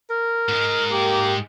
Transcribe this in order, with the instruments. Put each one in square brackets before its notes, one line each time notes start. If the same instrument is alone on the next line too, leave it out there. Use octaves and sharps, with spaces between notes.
[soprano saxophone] A#4 [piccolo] F6
[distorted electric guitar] G#2 G#3
[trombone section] A#3 G4 [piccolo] D6